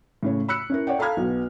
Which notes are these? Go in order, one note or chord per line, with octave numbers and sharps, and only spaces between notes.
A2 C#3 C#5
B5 E6 F#6 C#7
C#4 E4 A#4
C#5 D5 F#5 G5
A4 F5 A#5 B5 F6 G#6
B1 B2